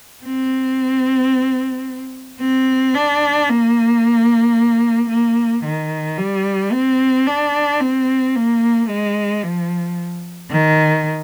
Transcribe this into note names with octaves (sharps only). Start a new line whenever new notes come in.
C4
C4
D4
A#3
A#3
D#3
G3
C4
D4
C4
A#3
G#3
F3
D#3